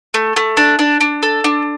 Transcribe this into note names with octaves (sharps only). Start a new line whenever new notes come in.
A3
A3
D4
D4
D4
A4
D4